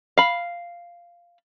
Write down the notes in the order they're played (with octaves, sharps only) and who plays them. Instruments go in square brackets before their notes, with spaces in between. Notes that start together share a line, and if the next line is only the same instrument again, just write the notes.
[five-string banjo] F5 B5